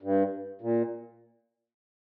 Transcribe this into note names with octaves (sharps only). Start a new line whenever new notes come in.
G2
A#2